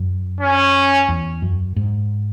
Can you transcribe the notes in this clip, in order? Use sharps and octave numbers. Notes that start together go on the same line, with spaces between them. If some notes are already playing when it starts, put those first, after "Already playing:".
Already playing: F#2
C#4
E2
F#2
G#2